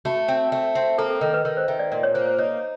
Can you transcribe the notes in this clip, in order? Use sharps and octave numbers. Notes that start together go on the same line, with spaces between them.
A3 F#4
C4
A3
C4
A#3 A4
A4
D#3 A#4
B4
D#3 A#4
C5
D#3 E5
D5
A#2 D5
C#5
A#3 C5
C5
D#4 C#5